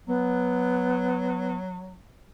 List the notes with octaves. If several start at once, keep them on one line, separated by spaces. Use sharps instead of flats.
F#3 B3